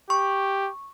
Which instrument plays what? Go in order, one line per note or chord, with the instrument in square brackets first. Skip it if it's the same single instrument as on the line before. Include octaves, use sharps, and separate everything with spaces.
[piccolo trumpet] G4 [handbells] C#6